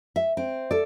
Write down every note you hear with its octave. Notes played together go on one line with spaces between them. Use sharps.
E5
C4
A4 D5